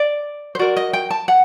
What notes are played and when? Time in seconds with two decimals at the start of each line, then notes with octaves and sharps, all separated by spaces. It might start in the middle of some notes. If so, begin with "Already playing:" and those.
Already playing: D5
0.55 C5
0.59 F#4 A#4 D5
0.77 D#5
0.93 G5
1.10 A5
1.28 F#5